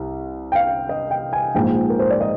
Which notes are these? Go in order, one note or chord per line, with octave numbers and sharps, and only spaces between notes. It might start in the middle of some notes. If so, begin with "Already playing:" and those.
Already playing: C2
G5
F5
D#5
G5
G#5
A#1 G#2 F3 G5
A#4
C5
D5
D#5